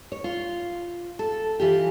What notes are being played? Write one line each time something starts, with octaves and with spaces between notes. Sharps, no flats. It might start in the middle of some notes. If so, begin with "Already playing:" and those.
C#5
F4
A4
E3 F4 G4